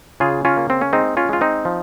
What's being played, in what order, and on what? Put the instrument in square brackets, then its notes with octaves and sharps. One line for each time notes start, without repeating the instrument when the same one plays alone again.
[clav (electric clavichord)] C#3 F4 G#4
C#4 F4
A#3
C4
C#4
G#3 C4 D#4
C#4 F4
G#3 F4
C4 D#4
F3